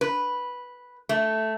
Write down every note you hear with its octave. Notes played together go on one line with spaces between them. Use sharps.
B4
A3